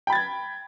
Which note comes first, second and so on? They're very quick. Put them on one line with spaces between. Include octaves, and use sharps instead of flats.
G5 B5 A6 G#6